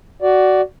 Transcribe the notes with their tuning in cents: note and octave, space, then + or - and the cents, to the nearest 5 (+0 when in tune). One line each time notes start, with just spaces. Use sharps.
F#4 +10 D5 +0